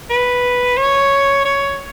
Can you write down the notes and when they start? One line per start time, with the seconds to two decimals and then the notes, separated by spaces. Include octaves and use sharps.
0.10 B4
0.78 C#5
1.45 C#5